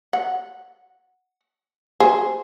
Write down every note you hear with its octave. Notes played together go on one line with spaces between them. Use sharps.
F#5
G#4 C5